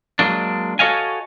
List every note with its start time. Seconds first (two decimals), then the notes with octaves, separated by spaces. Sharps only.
0.19 F#3 G#3 A#3 D4
0.79 F#4 A4 C#5 D#5 F5 G#5